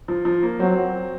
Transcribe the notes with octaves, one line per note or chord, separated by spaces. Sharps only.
F3
F3
A#3
F#3 C4